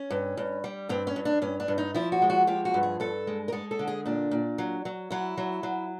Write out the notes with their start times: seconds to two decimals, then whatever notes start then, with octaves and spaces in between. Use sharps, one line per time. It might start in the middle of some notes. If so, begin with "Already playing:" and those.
Already playing: C#4
0.10 G2
0.37 G2
0.64 G3
0.89 G2 C4
1.07 C#4
1.16 G2
1.25 D4
1.42 G2 C#4
1.60 D4
1.68 G2
1.78 D#4
1.95 F3 E4
2.12 F#4
2.22 G#3
2.30 F#4
2.47 F3 G4
2.65 F#4
2.74 G2
2.83 G#4
3.00 G2 A4
3.27 G#3
3.48 A#4
3.52 G#3 A4
3.71 A4
3.79 D3
3.87 G#4
4.06 A#2 D4
4.31 A#2
4.58 F#3
4.85 F#3
5.10 F#3 E4
5.38 F#3
5.63 F#3